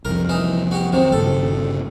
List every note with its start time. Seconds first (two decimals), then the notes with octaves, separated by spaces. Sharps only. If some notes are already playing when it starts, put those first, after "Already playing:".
0.05 C2 F2 A#4
0.29 E3 D#4
0.71 F#4 G4
0.92 C3 D#3 F#3
1.12 G1 A#2 C#3 A4